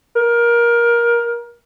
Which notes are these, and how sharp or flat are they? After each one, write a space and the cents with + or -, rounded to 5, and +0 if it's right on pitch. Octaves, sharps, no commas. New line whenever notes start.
A#4 +20